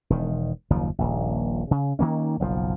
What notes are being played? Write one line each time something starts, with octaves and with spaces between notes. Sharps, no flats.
E1 D#3
F#1 D#2 F3
D#1 A#1
C#3
D#3 F3 A#3 C#4
F#1 B1 A#2 F3